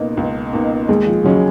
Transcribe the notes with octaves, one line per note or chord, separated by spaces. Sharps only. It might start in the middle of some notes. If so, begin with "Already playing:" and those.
Already playing: C#2 B2 A#3 D#4
C#2
B2 A#3 D#4
D#2 G#3
F3
C#3 F#3 G#3 C#4